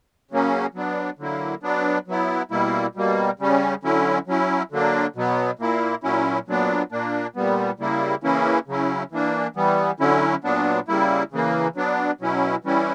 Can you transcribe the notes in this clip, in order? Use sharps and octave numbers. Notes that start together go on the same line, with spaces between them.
C#3 F#3 A#3 C#4
F#3 B3 D4
D3 F#3 A#3 E4
F#3 B3 D4
F#3 B3 E4
B2 G3 A#3 E4
B2 G3 A#3
C#3 G3 C#4
D3 F#3 C#4 E4
F#3 C#4 E4
D3 F#3 A#3 D4
B2 F#3 B3
A#2 A#3 E4
A#2 F#3 C#4 E4
A#2 F#3 B3 D4
A#2 A#3 D4
A#2 G3 B3
C#3 G3 A#3 E4
C#3 E3 A#3 C#4 E4
C#3 F#3 C#4 E4
E3 A#3 D4
E3 G3 B3
D3 F#3 C#4 E4
A#2 F#3 B3 D4
C#3 G3 A#3 E4
C#3 E3 A#3
F#3 B3 D4
B2 F#3 C#4 E4
E3 G3 C#4 E4